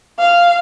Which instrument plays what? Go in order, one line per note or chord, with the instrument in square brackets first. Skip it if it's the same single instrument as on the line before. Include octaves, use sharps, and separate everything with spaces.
[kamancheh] F5